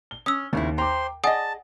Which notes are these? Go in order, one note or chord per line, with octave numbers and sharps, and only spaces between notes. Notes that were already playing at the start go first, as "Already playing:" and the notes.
G7
C#4 D#6 E6
D#2 C#3 C4 E4
C5 G5 A#5 C6 D6
G#4 D5 D#5 F#5 G#5 A5 D#6